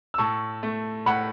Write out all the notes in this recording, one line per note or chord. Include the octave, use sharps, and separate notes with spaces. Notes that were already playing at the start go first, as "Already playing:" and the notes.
E6
A2 A5 C#6
A3
A2 F#5 B5